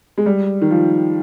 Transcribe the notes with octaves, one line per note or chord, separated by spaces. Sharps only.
G#3
G3
D#3
F3